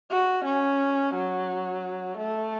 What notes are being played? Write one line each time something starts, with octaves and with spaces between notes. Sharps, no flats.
F#4
C#4
F#3
A3